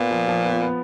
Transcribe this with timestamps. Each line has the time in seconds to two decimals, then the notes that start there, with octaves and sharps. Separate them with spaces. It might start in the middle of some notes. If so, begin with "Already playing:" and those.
Already playing: A#2 B3
0.11 F3
0.28 F3
0.44 B3
0.61 B3